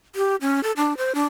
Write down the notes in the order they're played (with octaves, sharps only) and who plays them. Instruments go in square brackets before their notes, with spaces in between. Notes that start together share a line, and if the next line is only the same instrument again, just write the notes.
[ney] G4
C#4
A4
D4
C5
D4